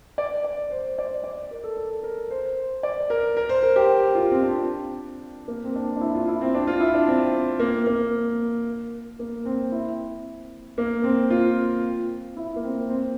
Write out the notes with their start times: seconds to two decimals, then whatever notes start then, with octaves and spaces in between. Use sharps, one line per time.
0.18 D5
0.44 D5
0.71 C5
0.98 D5
1.24 D5
1.51 A#4
1.64 A4
1.77 A4
2.03 A#4
2.30 C5
2.83 D5
3.10 A#4
3.37 A#4
3.49 C5
3.63 A#4
3.76 G4
4.15 F4
4.31 C4
4.42 D4
5.48 A#3
5.64 C4
5.75 D4
5.96 D4
6.01 E4
6.15 F4
6.28 E4
6.41 C4
6.55 D4
6.67 F4
6.80 E4
6.94 D4
7.07 C4
7.60 A#3
7.86 A#3
9.19 A#3
9.45 C4
9.72 E4
10.78 A#3
11.04 C4
11.30 F4
12.37 E4
12.56 A#3
12.63 C4
12.89 C4